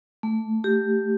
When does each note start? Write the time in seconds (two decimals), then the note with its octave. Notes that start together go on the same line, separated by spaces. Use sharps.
0.23 A3
0.64 G4